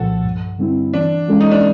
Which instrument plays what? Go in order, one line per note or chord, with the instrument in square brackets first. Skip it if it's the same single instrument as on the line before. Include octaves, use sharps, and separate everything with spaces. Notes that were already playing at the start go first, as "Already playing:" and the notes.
Already playing: [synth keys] C2 A#2 F3 [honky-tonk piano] F#4 A4
[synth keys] G2
D3 G3 C4 E4
[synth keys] E3 [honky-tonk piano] D4
[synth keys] G#3 C#4 F4 A4
[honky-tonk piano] D#4
D4